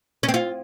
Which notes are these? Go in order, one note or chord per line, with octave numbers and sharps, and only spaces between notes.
C#4
C4
F4